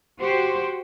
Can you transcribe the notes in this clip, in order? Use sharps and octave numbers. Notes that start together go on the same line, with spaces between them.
F#4 G4 C5